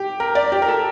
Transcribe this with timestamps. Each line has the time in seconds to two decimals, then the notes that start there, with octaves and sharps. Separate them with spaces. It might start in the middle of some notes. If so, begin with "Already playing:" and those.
Already playing: G4
0.20 A#4
0.35 D5
0.52 G4
0.62 A#4
0.68 A4